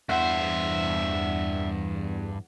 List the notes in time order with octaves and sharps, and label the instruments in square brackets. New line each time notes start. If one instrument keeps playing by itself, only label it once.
[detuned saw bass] E2 [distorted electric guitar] G2 C5 [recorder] E5 [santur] F#5